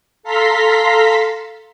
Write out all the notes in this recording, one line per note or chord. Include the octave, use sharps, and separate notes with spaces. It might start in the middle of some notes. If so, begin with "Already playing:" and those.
A4 F5 A#5 C6 B6